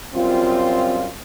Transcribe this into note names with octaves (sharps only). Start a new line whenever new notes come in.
F#2 G3 C4 F4